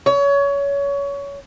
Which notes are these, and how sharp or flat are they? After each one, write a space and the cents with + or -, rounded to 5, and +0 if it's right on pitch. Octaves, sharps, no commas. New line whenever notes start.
C#5 +25